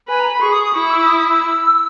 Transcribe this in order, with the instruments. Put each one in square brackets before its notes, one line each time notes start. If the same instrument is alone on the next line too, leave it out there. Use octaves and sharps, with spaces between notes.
[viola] B4 [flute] G#5
[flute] A#5
B5
[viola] G#4 [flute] C#6
[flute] D#6
D#6
[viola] E4 [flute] C#6
[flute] E6
D#6
D#6
E6